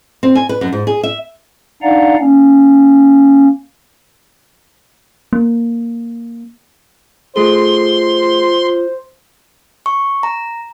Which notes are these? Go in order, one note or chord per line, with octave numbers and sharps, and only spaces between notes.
C4
G#5
B4
F#2
G#2
G#4
E5
D4 D#4 D5 F5 F#5 A#5
A#3 C#4
A#3
A3 F4 G#4 A4 C5 C6
C#6
A#5